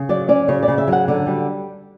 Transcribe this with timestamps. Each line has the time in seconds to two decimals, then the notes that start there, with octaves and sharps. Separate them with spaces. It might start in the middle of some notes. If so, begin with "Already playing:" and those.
Already playing: C#3
0.09 F#3 D5
0.28 C#4 D5
0.48 C#3 C#5
0.63 D5
0.68 C#3
0.78 E5
0.88 F#3 F#5
1.08 D3 D5
1.27 G3